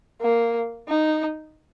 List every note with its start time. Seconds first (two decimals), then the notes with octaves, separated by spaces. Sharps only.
0.21 A#3
0.88 D#4